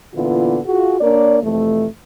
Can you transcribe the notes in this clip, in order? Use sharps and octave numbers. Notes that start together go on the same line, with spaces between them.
A#2 D3 E3 B3 E4 F4
F4 F#4 G#4
A#3 D4 A#4 C#5 D5
F2 C3 E3 A3